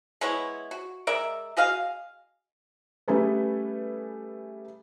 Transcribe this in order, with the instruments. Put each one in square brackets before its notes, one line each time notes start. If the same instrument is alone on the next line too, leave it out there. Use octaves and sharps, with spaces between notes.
[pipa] G#3 B3 E4 C#5
F#4
G#3 A#4 D5 E5
F#4 G#4 D#5 F5
[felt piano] G3 A3 C#4 G#4 A4 B4